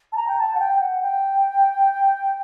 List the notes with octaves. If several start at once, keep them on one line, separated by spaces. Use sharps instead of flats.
A5
A#5
G5
A5
F#5
G5
F#5
G5